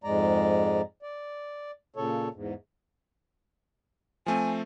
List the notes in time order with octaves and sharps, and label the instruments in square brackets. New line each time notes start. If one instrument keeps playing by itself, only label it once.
[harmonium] F2 G#2 G#3 D5 A#5
D5
A#2 C#3 A4 C#5
E2 G#2
[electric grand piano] F3 A3 C4 [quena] G#5